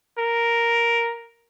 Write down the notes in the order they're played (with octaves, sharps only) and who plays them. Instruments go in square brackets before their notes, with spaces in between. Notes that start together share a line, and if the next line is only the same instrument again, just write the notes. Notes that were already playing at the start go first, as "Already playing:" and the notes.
[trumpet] A#4